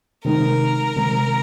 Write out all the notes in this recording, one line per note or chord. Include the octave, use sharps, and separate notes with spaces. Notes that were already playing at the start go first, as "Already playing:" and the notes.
C3 D#3 G#3 D#4 A#4
C3 D#3 G#3